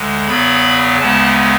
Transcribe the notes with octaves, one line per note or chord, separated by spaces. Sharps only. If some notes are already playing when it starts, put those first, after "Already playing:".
Already playing: D2 D3 G#3
E2 C#3 F#3 B3 B5
D2 C#3 G#3 B3 A5